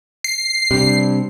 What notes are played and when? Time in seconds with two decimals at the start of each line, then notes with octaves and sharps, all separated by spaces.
0.24 C7
0.71 C3 G3 D4 G4